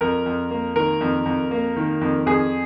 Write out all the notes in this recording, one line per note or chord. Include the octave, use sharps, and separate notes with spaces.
F2 A#4
F2
A#3
D#3 A#4
F2
F2
A#3
D#3
F2
F2 G#4